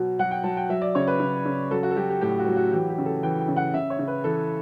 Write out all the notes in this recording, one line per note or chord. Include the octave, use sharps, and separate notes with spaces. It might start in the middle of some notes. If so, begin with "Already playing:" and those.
Already playing: B2 F#3
F#3 F#5
G5
F#3 A5
G5
F#3 E5
D5
C#3 C#5
B4
C#3
C#3
F#3 A4
F#4
A4
F#3 G4
G4
A2 G4
F#4
F#3
F#4
E3 G4
G4
C#3
A4
E3 G5
G5
C#3
F#5
C#3 E5
C#5
C#3
B4
E3 A4